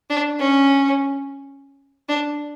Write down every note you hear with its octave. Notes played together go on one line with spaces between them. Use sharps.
D4
C#4
D4